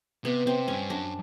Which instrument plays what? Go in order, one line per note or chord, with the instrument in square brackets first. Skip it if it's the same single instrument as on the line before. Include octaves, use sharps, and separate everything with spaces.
[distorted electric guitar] C3 [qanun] B3
[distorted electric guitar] C3 [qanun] C4
[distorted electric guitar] G2 [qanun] C#4
[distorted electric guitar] F#2 [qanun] D4